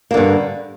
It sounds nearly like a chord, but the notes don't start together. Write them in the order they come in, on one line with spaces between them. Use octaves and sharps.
A#3 D3 G2